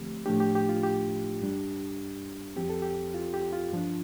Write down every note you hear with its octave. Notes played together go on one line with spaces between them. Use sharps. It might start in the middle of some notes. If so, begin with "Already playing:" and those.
Already playing: D2 D3 F3 A3 C4 G4
A2 F3 A3 D4 G4
G4
G4
F4
G4
G2 G3 D4
F2 F3 C4 G4
A4
G4
F4
G4
F4
G2 F3 D4